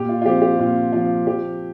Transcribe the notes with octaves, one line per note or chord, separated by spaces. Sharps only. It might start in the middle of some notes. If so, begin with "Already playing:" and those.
Already playing: A#2 G4
F4
F4
F3 C4 G4
G4
A#2 F4
F3 C4 F4
F3 G4